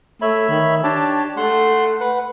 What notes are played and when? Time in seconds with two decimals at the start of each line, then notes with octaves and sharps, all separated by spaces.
0.22 A3 C#5 E5 B5
0.49 D#3
0.84 D4 G4 C#5 A5
1.37 A3 F#5 C6
2.00 B4 F#5